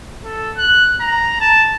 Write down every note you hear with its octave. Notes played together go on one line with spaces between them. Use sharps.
A4
F#6
A#5
A5